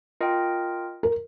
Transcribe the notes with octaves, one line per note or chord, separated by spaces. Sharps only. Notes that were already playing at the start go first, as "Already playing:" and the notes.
F4 A#4 D#5 G5
A#4